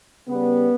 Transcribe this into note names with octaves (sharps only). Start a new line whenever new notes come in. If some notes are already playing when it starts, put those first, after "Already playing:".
C#3 G3 B3